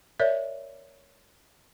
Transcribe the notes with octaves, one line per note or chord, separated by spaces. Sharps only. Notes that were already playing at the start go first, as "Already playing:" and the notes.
A#4 C#5 D5 E5